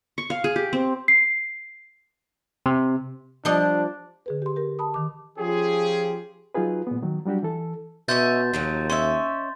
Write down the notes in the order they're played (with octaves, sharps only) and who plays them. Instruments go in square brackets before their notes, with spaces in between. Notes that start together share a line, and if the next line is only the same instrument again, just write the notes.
[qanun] C#6
F5
G#4
G4
C4
[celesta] C7
[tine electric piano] C3
[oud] F3 G3 D#5 [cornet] D4
[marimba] D3 G#4 B4
G4 C6
G4 A#4
A5 B5 D#6
D#3 D6
[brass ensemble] F3 C#4 F4 G4 G#4
[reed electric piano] F#3 D#4 F4 G#4 B4
A#2 B3
D#3 F#3
F#3 G3 D4 F#4 G4
E3 A4
[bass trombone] B2 [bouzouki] C#4 D#4 E5 [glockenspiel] C6 G6 A6
[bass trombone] D#2 [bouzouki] D#3 F3 F#3
[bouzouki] C#4 D#4 E5 [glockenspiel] C6